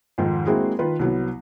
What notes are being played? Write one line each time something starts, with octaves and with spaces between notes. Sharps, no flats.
F2 G#2 D#3
G#3 A#3 C4 E4 F#4 G#4
D#3 F4 B4
C2 F#3 B3